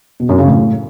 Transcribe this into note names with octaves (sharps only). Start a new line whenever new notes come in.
B2
F#2
C#3
A2